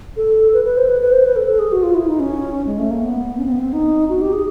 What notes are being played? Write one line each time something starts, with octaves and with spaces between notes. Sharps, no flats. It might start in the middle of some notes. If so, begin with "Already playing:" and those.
A4
B4
B4
C5
B4
B4
C5
B4
A4
A4
G#4
F#4
F4
E4
D#4
C#4
G#3
A3
A#3
B3
C#4
C4
B3
C4
D#4
F#4
G4
G#4